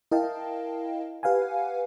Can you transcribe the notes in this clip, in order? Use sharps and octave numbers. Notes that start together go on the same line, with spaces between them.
E4 A#4 D#5 F5 G5 A5
G4 B4 F5 F#5 G#5